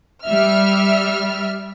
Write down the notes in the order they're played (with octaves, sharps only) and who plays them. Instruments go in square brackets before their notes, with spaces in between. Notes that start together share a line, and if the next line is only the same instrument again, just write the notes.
[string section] G3 E5 F6